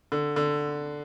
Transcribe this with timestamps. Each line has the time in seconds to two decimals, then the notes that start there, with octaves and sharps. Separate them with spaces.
0.12 D3
0.36 D3